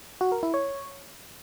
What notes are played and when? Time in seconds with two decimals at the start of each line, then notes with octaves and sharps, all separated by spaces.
0.21 F#4
0.32 A#4
0.43 E4
0.54 C#5